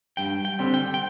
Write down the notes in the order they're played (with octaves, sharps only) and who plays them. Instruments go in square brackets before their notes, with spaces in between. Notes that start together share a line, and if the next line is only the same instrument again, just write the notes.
[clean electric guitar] G2 G5
G5
D3 G3 C4
G5
G5